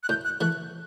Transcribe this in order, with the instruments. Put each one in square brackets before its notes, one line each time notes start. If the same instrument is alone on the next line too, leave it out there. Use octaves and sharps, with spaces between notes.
[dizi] F#6
[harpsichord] A2 [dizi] G6
[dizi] F#6
[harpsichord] E3 A3 [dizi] F#6